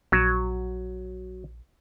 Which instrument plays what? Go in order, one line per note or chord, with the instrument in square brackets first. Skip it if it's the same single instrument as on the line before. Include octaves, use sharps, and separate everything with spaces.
[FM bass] A#1 [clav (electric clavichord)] F#3